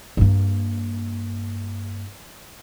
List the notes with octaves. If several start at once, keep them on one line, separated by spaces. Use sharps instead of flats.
G2 A#3